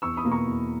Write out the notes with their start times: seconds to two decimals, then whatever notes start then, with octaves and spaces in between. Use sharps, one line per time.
0.02 E2 C#6 E6
0.17 B5 D#6
0.25 B2 A#3
0.32 A#5 C#6
0.47 E2